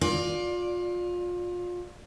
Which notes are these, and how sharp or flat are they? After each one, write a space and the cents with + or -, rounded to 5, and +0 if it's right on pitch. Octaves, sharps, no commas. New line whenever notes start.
F4 +25 D5 +0